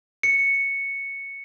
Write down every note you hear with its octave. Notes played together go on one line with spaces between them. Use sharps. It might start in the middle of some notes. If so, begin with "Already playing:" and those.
C#7